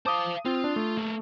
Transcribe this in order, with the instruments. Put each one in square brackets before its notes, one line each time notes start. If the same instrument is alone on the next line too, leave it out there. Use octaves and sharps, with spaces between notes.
[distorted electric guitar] C5 F5 [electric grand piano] A5 D6 D#6
[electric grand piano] C4 [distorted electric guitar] F4
[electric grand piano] D4
A3
[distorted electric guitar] A#3 A4